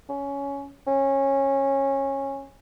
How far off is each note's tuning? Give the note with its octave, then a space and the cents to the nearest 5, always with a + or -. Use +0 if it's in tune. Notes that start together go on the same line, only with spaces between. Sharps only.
C#4 +15
C#4 -20